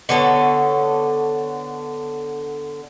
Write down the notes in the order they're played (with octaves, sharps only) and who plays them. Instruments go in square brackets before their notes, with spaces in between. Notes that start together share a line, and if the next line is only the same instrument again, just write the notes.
[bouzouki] D3 B3 A4 C#5